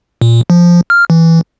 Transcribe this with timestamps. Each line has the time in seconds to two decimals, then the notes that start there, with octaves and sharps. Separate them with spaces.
0.22 A#2
0.50 F3
0.90 F6
1.10 E3